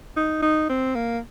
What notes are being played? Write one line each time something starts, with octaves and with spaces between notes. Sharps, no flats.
D#4
D#4
C4
A#3